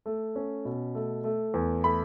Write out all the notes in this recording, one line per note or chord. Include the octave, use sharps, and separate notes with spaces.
A3
C#4
B2
A3
A3
E2
A3 B5